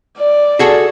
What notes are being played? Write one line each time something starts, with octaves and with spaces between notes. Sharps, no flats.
D5
F#4 G#4 A4